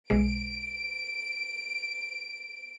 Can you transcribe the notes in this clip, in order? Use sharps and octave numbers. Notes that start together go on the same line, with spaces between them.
B1 B2 G#3 D7